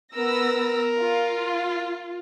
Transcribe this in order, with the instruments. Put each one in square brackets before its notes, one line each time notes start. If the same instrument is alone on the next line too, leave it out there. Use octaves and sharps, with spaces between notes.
[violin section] B3 E6 A#6 [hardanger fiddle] A#4
[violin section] F4